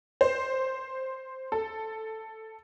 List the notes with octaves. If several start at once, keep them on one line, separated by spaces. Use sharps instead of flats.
C5
A4